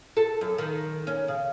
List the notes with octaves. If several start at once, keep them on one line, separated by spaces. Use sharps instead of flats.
A4
F#2
D#3
C#4
C#3